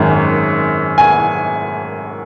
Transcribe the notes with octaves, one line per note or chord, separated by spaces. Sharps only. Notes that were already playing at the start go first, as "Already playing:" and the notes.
Already playing: G#1 F#2 D#3 G#3
G#5